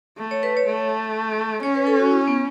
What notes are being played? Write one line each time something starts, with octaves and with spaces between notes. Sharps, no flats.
A3
C#5
B4
C#5
A3
C#4 C#5
B4
A4
F#4
E4
B3